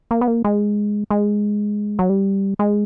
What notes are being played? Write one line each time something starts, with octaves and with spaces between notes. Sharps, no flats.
A#3
B3
A#3
G#3
G#3
F#3
G3
G#3